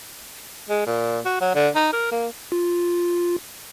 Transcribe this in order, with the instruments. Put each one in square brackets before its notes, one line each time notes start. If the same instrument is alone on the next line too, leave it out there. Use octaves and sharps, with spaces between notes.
[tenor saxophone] G#3
A#2
F#4
F#3
D3
D#4
A#4
A#3
[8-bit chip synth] F4